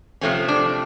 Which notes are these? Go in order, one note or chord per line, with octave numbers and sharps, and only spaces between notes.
C3 F3 A3 C4 C#4
D4